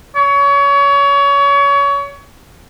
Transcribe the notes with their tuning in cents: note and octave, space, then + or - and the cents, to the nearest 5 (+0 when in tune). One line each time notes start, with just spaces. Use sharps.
C#5 +30